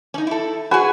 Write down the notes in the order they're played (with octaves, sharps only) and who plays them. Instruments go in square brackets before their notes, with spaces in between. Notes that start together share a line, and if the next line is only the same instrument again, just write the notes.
[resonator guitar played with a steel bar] C#4 D#4
E4 A4
[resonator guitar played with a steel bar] F#4 G#4 [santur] B4 G#5